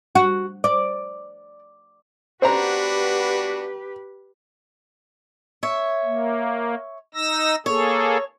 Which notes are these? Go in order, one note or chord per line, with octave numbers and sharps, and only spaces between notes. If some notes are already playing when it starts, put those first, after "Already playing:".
F#4
D5
B3 D4 F#4 G4 B4 C5 A#5
C#5 E5
A#3
D#4 E6 A#6
A#3 G#4 A4 C#5